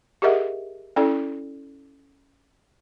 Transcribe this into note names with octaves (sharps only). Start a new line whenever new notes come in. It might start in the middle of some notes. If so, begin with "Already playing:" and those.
G4 G#4 A#4 D#5 E5 F#5
C#4 E4 A4 D5